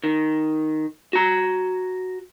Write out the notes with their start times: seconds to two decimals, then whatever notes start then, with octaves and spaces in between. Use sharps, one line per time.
0.04 D#3
1.13 F#4 A#5